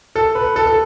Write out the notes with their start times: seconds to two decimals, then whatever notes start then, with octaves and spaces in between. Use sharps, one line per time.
0.16 A4
0.35 B4
0.56 A4
0.67 A4